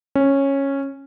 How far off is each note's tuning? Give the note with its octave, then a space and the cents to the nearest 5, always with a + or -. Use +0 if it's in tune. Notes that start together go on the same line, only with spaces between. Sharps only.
C#4 -10